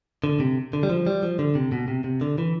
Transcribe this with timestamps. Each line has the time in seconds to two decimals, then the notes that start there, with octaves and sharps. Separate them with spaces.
0.24 D3
0.40 C3
0.73 D3
0.83 G3
0.90 F3
1.07 G3
1.23 F3
1.39 D3
1.55 C3
1.72 B2
1.88 C3
2.04 C3
2.21 D3
2.38 E3